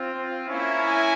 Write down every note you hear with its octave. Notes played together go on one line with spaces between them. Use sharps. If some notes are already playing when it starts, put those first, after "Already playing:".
Already playing: C4 F4
A#3 C#4 E4
G#5